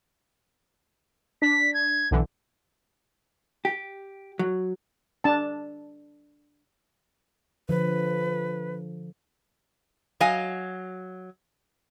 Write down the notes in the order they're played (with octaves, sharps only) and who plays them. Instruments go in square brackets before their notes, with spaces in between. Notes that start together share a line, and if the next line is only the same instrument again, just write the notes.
[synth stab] D4 [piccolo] B6
[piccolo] G#6
[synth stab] B1 D3 E3
[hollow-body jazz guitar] G4
F#3
[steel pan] D4 A5
[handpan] D3 F3 [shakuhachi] B4
[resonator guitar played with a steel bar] F#3 D#5 F5 G#5